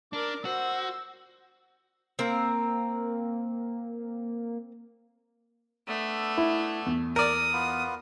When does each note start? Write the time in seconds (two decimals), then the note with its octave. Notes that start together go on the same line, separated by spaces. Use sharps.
0.13 D4 A#4 D6
0.45 F#4 C5 E6
2.19 A#3 C4 A#4
5.88 A3 B3 D4 A4
6.37 E4
6.86 E2
7.16 A#4 D5 D#6
7.53 B3 F4 B4